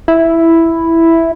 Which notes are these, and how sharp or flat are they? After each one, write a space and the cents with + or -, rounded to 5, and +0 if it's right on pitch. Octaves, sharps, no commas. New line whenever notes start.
E4 +0